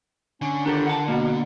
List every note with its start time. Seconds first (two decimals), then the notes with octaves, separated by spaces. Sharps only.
0.42 D3 C#4
0.66 D#3 D4 G4 A4
0.87 F#5 A5
1.08 B2 A#3 B3